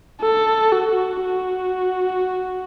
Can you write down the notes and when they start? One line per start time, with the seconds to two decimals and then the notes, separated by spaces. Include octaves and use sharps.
0.21 A4
0.72 F#4
1.22 F#4